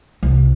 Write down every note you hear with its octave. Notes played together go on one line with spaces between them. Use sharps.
C2